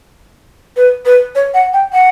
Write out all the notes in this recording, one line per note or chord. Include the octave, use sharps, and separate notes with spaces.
B4
B4
C#5
F#5
G5
F#5